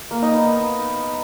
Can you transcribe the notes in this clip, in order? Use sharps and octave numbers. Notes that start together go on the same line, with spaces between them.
A#3
D#4
B3